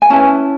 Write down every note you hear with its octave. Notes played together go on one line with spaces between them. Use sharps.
G#5
C#4 E4 B4 A5